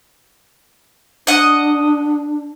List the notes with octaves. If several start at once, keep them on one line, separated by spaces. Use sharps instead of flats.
D4 D#5 F#5